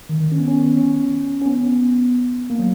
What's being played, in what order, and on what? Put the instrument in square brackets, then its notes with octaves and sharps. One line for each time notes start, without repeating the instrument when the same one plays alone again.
[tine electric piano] D#3
D#3
C#4
B3
C#4
C#4
C#4
B3
A#3
F#3